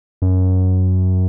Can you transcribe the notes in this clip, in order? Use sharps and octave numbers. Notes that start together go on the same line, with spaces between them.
F#2